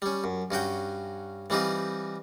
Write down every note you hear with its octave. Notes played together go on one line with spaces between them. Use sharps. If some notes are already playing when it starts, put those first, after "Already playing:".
G3 C#4
F#2
G2 C#4 F#4 G5
E3 G3 C4 D#4 F4